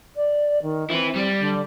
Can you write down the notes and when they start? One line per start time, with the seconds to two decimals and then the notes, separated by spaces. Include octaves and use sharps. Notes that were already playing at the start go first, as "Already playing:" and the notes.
0.16 D5
0.62 D#3
0.90 C4 E4 B4
1.16 G3
1.39 D3